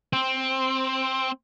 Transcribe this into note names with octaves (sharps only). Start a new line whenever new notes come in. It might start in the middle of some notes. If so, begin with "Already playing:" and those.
C4